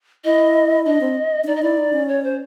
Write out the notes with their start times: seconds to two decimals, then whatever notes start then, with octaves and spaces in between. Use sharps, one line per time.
0.25 E4 D#5
0.86 D4 D#5
1.01 C4
1.43 D4
1.47 D#4 D5
1.56 D#5
1.62 E4 D5
1.77 D#4
1.93 C#4
2.08 C#5
2.24 C5